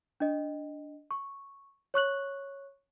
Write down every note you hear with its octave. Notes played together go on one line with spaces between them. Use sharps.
D4 D#5
C#6
C#5 C#6 F#6 F#7